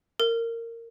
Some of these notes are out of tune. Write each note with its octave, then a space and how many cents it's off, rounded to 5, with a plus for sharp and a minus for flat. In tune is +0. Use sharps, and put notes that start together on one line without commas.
A#4 -20